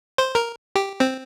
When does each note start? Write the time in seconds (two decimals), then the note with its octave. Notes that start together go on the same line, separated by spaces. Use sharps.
0.18 C5
0.35 A#4
0.76 G4
1.00 C4